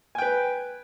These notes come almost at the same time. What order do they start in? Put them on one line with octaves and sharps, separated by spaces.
G#5 G5 B4